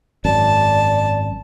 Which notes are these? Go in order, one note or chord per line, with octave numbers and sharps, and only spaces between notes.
G#1 F#2 D5 A5